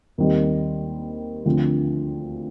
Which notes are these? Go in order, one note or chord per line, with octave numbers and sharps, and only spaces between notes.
D#2 D#3 G3 C4 D#4
D2 D3 F3 C4